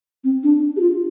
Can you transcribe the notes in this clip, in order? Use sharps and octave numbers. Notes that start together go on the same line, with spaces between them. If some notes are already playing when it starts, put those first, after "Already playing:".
C4
D4
G4
F4